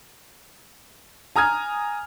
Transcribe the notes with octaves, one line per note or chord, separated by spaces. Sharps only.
G#5 A#5 D#6 F6 G#6